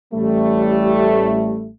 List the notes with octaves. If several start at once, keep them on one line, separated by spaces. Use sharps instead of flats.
A1 G3 A3